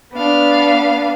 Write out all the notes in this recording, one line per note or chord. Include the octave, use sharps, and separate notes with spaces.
B3 D4 B4 F5